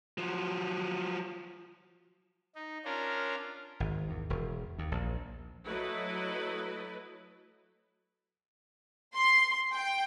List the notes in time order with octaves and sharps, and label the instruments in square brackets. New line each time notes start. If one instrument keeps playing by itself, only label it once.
[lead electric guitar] F3 F#3
[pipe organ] D#4
C#4 D4 F4 A#4
[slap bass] G#1
E2
E1
D#2
A#1
[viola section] F#3 A3 E4 B4 D#5
[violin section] C6
G5